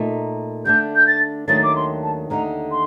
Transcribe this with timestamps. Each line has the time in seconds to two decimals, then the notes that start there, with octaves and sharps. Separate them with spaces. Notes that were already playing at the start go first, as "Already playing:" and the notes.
Already playing: A#2 A3 D#4
0.65 D3 A3 D4 G6
0.95 G6
1.07 A6
1.48 D#2 D#3 F#3 A3 D4 A6
1.63 D6
1.76 C6
2.02 A5
2.30 D#2 D3 A3 D#4 A#5
2.71 C6